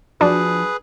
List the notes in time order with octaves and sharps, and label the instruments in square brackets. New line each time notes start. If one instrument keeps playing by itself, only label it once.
[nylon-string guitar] F3 F#4 [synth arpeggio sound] D4 [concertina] G#4 B4